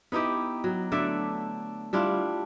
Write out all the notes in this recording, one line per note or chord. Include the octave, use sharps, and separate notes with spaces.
B3 D#4 E4 G4
F#3
D3 A3 D5 E5
G3 D4 E4 F4